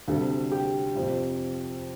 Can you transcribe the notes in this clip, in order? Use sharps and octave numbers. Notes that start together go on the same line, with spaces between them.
D2 C3 G3 A4
G4
F2 C3 F3